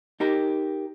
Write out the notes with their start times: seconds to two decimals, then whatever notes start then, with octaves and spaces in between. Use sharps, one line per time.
0.20 D#4 G4 A#4